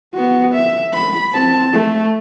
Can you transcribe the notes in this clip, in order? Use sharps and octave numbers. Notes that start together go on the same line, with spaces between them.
B3 F#4
E5
B5
C4 A5
A3